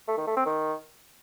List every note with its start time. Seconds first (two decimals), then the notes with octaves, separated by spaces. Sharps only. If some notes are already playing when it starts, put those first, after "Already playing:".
0.08 A3
0.17 D#3
0.27 A3
0.37 C4
0.46 D#3